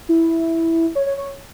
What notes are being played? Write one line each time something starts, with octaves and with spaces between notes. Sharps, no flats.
E4
C#5
C#5
C#5